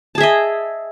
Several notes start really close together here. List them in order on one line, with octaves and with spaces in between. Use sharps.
A5 G#4 E5 D#5